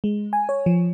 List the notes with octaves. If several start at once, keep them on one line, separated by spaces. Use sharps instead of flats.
G#3
G#5
C#5
F3